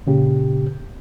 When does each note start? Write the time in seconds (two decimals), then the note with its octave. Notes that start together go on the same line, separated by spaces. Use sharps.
0.07 A#2 C#3 G4